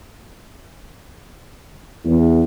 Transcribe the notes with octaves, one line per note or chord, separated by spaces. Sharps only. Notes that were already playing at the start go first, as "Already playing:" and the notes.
E2